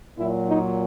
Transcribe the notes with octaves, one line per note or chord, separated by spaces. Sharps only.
A#2 F#3 E4
D#4